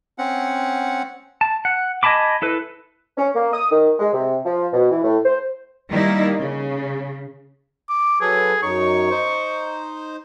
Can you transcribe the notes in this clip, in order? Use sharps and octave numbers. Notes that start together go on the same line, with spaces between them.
C4 C#4 F#5
A5
F#5
D#5 G#5 A5 B5 D6
E4 A4 B4
C#4
A#3
D#6
D#3
G#3
C3
F3
B2
E3
A2
C5
D#3 G3 A#3 D#4 E4
C#3
D6
F#3 G#4 A4 B4
F#2 D#4 C#5 C#6
D#4 C5